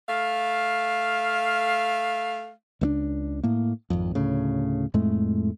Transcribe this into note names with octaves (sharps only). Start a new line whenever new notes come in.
A3 F5
C#2 A3 D4
A2 A#3
G#1 F2
D2 A2 C#3
F2 A2 G#3 A3